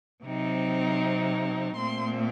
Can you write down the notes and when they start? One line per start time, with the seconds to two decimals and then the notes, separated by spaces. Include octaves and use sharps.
0.24 C3 F#3 C4 D#4
1.76 A#2 A3 C4 C6